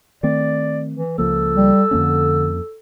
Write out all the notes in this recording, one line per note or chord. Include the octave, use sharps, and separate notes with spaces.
D#3 A3 C4 D5
E3
C#2 F3 A#3 A4
G3
F2 D3 A#3 C#4